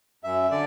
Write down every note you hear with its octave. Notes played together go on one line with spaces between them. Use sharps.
F#2 E5
D3 D5